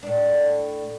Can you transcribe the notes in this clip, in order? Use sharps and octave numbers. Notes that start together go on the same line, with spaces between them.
A2 D4